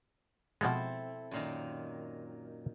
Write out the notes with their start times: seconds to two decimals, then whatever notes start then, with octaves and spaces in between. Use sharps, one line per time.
0.61 B2 F3 G#3 C4 E4 A4
1.31 F#2 A#2 D#3